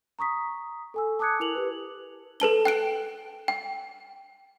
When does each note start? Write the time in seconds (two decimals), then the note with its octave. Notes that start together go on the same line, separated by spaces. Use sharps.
0.19 A#5 C#6 D#6 B6
0.94 A4 G#5 E6
1.19 A5 D6 D#6 F#6 G#6 C#7
1.40 E4 A#4 F7 F#7
1.55 G4 B4
2.40 A4 B4 A5 G7
2.65 G5 F#6 D7
3.48 G5